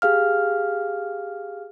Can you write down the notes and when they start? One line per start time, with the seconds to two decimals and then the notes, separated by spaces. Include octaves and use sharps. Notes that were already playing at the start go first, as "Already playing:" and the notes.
0.02 G4 G#4 F5 F6